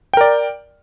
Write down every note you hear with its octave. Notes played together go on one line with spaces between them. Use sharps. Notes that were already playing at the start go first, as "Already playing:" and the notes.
A#4 D5 G5